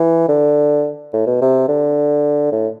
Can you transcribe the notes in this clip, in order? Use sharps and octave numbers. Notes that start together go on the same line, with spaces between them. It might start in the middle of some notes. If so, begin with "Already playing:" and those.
Already playing: E3
D3
A2
B2
C3
D3
A2